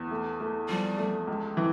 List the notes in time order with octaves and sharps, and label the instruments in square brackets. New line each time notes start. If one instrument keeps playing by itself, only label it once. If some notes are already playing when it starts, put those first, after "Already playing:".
Already playing: [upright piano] E2
A3
A3
[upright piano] F3 [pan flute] G3
[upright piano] A3
C#2
E3